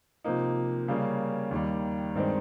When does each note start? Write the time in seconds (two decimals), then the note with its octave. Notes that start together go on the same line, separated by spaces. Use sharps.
0.24 C3 F3 A#3 D#4
0.88 C#3 G3 A#3 C#4
1.51 D#2 D#3 G3
2.15 G2 D#3 G#3 C4